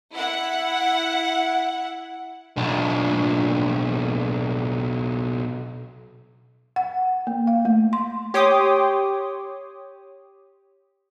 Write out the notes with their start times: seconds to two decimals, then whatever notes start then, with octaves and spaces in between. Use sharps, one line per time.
0.12 E4 F#5
2.57 B1 D4
6.76 F#5
7.27 A#3
7.47 F5
7.65 A3
7.93 C6
8.34 G4 C#5 G5 C6 D6 D#6